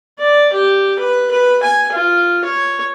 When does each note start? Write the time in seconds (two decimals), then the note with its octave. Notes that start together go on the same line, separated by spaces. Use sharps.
0.19 D5
0.53 G4
0.99 B4
1.31 B4
1.63 G#5
1.92 F4
2.45 C#5